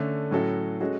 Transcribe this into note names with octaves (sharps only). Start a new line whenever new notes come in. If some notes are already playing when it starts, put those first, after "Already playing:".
Already playing: D3 A3 C#4
A2 F#3 C#4 F#4 A4
G#3 C#4 F#4 A4